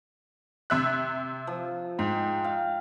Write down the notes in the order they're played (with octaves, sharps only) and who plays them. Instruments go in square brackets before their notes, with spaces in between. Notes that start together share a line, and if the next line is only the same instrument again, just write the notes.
[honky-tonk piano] C3 E5 F#6
[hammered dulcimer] F3
[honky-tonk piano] G#2 [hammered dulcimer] G5
[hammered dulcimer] F5